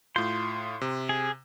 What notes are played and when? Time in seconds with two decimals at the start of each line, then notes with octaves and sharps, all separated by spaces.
0.16 A2 F4 C6 G6
0.81 C3
1.09 G#4